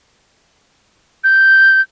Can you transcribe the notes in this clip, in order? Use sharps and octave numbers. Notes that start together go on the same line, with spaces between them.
G6